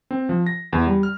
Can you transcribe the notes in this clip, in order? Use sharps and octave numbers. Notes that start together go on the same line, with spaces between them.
C4
F3
A#6
E2
G3
F6